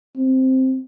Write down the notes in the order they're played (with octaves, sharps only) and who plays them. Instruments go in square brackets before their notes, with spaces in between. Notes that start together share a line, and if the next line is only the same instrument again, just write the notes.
[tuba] C4